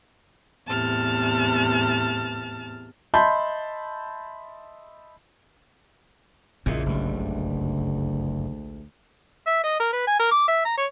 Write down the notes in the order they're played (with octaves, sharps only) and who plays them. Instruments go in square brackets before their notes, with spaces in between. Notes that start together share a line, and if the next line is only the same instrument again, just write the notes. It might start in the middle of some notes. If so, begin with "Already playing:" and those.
[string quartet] E2 A2 C3 A5 F6
[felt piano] D#5 E5 A5 B5 C6 G6
[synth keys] A#1 G#3 E5 [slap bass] E2 A#2 [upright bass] C#3
[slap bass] F#1 G2 [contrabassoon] D2
[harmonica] E5
D#5
A#4
B4
G#5
A#4
D6
E5
A#5
C#5